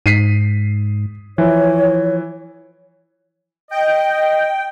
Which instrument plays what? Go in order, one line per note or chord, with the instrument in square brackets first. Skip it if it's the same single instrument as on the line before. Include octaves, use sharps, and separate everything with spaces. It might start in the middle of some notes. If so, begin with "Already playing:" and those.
[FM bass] G#2 [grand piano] B6 C7 D#7
[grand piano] E3 [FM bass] F3 [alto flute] C#5
[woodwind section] D#5 [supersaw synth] G5